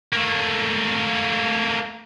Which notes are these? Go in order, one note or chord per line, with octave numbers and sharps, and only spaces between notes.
A3 A#3